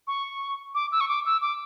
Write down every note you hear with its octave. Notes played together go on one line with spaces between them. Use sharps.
C#6
D6
E6
C#6
D6
E6
D6